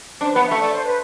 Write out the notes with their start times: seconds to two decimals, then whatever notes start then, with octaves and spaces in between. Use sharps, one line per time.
0.21 D4 C5
0.31 B4
0.36 B3
0.46 E5
0.51 A3
0.59 D5
0.72 C5
0.84 B4